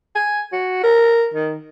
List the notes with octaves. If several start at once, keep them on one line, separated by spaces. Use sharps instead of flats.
G#5
F#4
A#4
D#3